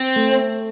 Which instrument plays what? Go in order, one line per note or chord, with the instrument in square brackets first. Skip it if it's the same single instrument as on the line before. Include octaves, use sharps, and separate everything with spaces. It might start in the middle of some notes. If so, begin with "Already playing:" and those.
Already playing: [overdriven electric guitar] C4
[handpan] A3